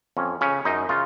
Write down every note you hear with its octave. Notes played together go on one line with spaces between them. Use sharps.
F2 C#4
C#3 C#4
F#2 D#4
C#3 F4